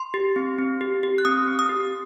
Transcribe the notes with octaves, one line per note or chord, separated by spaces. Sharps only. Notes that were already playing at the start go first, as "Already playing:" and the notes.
Already playing: C6
G4
C4
C4
G4
G4
F#6
C4 D#6
C4
D#6
G4